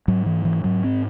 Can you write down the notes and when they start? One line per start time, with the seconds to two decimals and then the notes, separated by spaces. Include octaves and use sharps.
0.08 G#2 F#3
0.26 E3
0.45 E3
0.64 G#2 F#3
0.84 C4